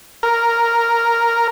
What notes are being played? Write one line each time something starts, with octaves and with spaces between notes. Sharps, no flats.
A#4